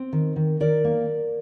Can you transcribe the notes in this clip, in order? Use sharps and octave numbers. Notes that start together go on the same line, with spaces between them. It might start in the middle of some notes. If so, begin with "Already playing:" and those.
Already playing: C4
D#3
D#3
D#3 A#4 D5
A#3